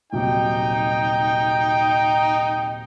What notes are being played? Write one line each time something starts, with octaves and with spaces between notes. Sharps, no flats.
D#1 C3 F#3 D#4 G5